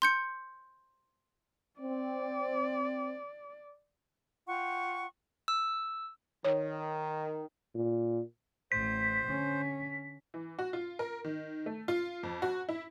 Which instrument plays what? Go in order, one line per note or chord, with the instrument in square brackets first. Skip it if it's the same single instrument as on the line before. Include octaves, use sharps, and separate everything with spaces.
[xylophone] C6 G6 C#7
[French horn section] C4 [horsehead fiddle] D5
[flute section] F4 F#5 G5 C#6
[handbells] E6
[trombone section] D#3 [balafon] C#5
[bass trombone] A#2
[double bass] A1 [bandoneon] C5 [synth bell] B6
[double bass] D3 C#4
[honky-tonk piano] E3
F#4
F4
A#4
D#3
A3
F4
F2
F#4
E4